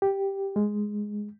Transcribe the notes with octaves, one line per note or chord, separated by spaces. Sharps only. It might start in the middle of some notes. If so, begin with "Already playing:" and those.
G4
G#3